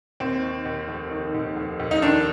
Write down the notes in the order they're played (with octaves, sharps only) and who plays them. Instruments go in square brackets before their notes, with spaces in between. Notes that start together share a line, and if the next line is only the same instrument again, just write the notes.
[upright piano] D#2 C4
D#3
D#2
F1
D#3
D#2
F1
D#2
D#4
D#3 D4